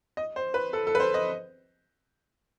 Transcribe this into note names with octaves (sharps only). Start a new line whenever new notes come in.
D#5
C5
B4
A4
A4
B4
C5
D#5